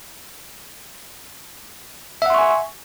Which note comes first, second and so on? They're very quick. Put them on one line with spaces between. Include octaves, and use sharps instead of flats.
E5 F#5 C6 C#6 G#5